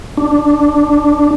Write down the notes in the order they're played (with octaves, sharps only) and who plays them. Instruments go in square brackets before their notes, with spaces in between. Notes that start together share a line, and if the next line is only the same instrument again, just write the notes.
[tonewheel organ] D4